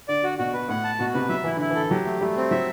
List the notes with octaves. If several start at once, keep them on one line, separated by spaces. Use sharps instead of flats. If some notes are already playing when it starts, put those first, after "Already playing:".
D3 D5
F#4
B2 F#4
B4
A2 F#5
A5
B2 F#4
C3 B4
F#3 E5
E3 E4
D3 E4
E3 A4
F#3 G4
A3
G3 A3
C4
F#3 E5